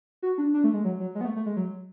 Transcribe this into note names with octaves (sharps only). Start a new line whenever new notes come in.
F#4
D4
D4
A3
G#3
F#3
F#3
G#3
B3
A3
A3
G#3
F#3